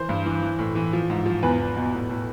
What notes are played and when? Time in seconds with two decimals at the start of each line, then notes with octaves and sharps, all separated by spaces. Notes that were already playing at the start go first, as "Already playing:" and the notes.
Already playing: E3 C5
0.09 G2
0.26 E3
0.42 E3
0.59 A2
0.75 E3
0.93 F3
1.10 G#2
1.26 F3
1.43 E2 B4
1.60 E2
1.76 B2
1.93 A2
2.10 A2